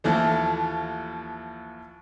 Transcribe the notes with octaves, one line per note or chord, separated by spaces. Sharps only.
D#2 E3 F3 A3